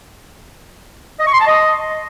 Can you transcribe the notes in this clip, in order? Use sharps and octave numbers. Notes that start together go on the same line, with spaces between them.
D#5
C#6
C6
A5
D#5